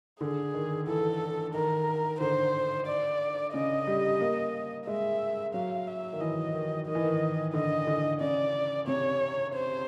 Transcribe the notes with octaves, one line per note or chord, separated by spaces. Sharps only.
D3 G#4
D#3
E3 A4
D#3 A#4
D3 C5
D5
C#3 D#5
G3
A#3
G#3 E5
F#3 F5
E5
D#3
E3 D#5
D#3
D#3 D#5
E3
D#3
D3 D#5
D3
C#3 D5
C3 C#5
C5